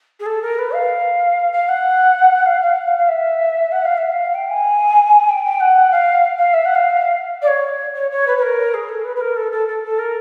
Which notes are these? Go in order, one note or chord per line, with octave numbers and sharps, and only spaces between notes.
G#4
A4
A#4
B4
F5
F5
F#5
F5
F5
F#5
F5
F5
E5
F#5
F5
E5
F5
G5
G#5
G5
G5
F#5
F5
F5
E5
F#5
F5
D5
C#5
C#5
C#5
B4
B4
A#4
G#4
A4
B4
B4
A#4
A4
A4
A4
A4
A#4